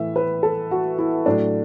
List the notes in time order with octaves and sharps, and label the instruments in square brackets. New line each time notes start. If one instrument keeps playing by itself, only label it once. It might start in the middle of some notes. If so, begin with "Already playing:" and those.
Already playing: [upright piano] A2 E3 E5
B4
A4
F#4
E4
A2 F#3 D4